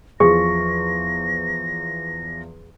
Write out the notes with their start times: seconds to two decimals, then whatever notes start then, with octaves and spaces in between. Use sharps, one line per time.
0.20 E2 F3 G#4 C#6 A#6